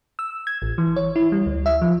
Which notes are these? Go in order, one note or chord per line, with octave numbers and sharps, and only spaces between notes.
E6
G#6
A1
E3
C#5
E4
G3
D2
E5
F3